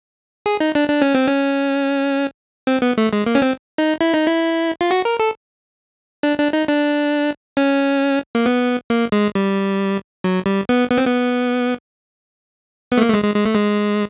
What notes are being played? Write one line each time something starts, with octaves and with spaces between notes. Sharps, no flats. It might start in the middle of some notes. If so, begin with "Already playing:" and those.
G#4
D#4
D4
D4
C#4
C4
C#4
C4
B3
A3
G#3
A#3
C#4
C4
D#4
E4
D#4
E4
F4
F#4
A#4
A4
D4
D4
D#4
D4
C#4
A#3
B3
A#3
G#3
G3
F#3
G3
B3
B3
C4
B3
B3
A3
A#3
A3
G#3
G#3
G#3
A3
G#3